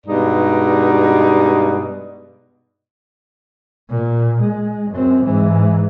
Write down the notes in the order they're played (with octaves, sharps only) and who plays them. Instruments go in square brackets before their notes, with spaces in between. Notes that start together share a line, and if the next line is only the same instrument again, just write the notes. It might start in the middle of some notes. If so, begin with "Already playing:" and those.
[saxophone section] G2 B2 G#3 D#4 D5
[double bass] A#2
G#3
F#2 C4
G#2 E3